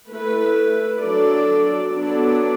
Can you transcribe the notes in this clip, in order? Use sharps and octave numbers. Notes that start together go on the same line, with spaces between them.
A3 E4 B4
F#3 D4 A4 D5
F#3 B3 D4 A4 D5